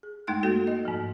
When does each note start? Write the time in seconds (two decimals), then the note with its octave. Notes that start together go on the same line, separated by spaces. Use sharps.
0.03 G#4
0.27 F#2 G#3 A3 D#4 G5 F#6
0.43 A#3 F#4 A4
0.67 D#5
0.85 G#2 F3